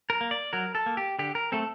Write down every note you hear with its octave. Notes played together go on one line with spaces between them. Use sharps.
A#4
A#3
D5
F#3 A#4
A4
A#3
G4
D3 G4
A#4
A3 C4 A4